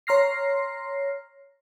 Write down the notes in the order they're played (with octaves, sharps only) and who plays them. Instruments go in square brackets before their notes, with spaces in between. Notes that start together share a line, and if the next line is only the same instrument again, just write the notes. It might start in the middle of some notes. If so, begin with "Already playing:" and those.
[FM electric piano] C#5 A#5 C6 F6 A#6 C7